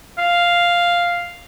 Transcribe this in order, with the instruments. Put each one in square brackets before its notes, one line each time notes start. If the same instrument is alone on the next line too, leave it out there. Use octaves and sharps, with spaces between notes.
[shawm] F5